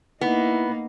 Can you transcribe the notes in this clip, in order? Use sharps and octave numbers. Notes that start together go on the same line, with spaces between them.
A#3 B3 D#4 E4